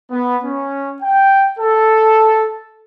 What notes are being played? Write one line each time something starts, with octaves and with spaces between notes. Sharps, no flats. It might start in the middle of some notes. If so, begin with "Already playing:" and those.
B3
C#4
G5
A4